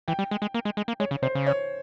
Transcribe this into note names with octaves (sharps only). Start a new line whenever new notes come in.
E3 G5
G3
G#3
G#3
A#3
G#3
G#3
A#3
G#3 C#5
C#3
C3 C5
C#3
C#5